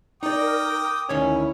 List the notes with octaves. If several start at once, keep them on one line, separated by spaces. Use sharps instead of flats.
D#4 A#4 D5 G5 D6 D#6 A#6
D2 D#3 C#4 E4 G#5